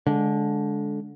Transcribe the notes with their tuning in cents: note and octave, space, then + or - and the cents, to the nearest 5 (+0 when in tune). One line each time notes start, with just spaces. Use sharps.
D3 -20 G#3 +0